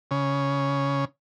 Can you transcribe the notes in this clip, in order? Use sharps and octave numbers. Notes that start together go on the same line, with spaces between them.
C#3